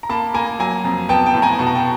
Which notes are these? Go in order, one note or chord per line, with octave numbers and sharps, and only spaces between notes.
A#5
A#3 A5 B5
A#3 G#5 A#5
F#3 G#5 A#5
F2
B3 G5 A5
G5 A5
A2
G#5 A#5
B2 A5
A#5
G5 A5